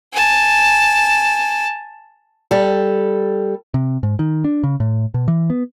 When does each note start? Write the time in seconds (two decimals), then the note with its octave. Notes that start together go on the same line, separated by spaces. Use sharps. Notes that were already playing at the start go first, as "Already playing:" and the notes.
0.13 G#5 A5
2.51 G3 A4
3.74 C3
4.03 G#2
4.19 D#3
4.44 D4
4.64 C#3
4.80 A2
5.14 B2
5.28 E3
5.50 B3